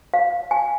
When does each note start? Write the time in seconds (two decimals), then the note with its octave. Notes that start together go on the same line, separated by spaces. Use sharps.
0.14 F5
0.51 G#5